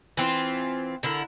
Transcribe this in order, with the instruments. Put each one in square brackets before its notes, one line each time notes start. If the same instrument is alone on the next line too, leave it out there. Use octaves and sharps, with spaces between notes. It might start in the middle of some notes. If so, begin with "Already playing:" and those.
[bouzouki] E3 C4 F4
D3 E4 A#4